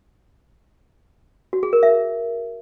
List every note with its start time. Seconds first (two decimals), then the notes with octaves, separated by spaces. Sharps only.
1.53 F#4
1.63 G#4
1.73 A#4
1.83 E5